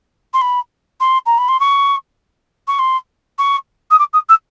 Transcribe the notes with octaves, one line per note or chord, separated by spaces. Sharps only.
C6
B5
C6
A#5
B5
C6
C#6
C#6
C6
C#6
D#6
D6
D#6
E6